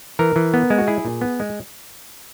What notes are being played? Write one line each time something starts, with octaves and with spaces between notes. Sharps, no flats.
E3 A#4
E3
B3
G#3
F#4
E4 G#4
A#2
B3
G#3